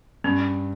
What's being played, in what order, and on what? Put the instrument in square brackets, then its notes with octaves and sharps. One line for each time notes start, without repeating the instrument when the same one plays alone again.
[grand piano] G2 [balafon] C#4